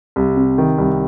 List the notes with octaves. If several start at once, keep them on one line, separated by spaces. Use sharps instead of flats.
C2
C3
D#3
C2